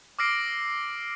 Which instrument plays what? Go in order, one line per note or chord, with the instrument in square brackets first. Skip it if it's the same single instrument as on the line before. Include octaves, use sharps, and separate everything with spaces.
[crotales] D6 E6 F6 A#6 C7 D7